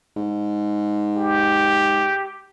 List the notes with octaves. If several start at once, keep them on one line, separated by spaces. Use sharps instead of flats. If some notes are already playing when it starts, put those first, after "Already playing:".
G#2
G4